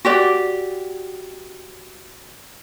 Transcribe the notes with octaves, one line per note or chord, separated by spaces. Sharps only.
F#4 G4 D5